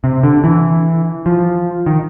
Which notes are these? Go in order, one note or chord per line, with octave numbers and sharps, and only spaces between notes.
C3
D3
E3
F3
D#3